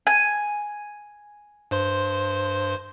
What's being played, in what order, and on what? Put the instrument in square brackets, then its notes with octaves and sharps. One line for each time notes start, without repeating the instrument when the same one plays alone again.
[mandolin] G#5
[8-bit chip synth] G2 C5 C6